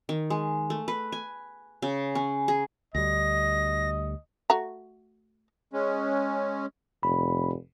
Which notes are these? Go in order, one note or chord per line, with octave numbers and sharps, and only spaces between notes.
D#3
G#3
A3
B4
G#5
C#3
C#4
G#4
D2 G3 D#5 A#6
A3 F#4 A#5
G#3 C#4
F1 B5